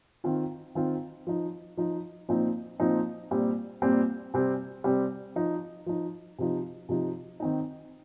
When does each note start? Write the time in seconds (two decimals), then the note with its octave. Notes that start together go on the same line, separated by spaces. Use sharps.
0.24 D#3 C4 F4
0.75 D#3 C4 F4
1.27 F3 D#4
1.77 F3 D#4
2.29 A#2 F3 C4 D#4
2.80 A#2 F3 C4 D#4
3.31 A#2 G3 C4
3.82 A#2 G3 C4
4.34 C3 G3 C4
4.84 C3 G3 C4
5.36 F3 D#4
5.86 F3 D#4
6.38 C3 F3 D#4
6.89 C3 F3 D#4
7.40 D#3 C4 D#4